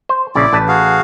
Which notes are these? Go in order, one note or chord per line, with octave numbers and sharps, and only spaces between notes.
C5
A#1 C#3 E4 D5
A1 B4 A5
F#4 G#4 F5